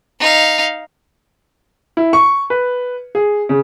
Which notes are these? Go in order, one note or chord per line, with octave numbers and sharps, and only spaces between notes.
D#4 F5
E4
C#6
B4
G#4
C#3